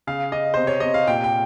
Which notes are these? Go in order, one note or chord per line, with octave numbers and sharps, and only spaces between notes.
C#3 F5
C#3 D#5
C3 C5
C#5
C3 D#5
F5
A#2 G5
G5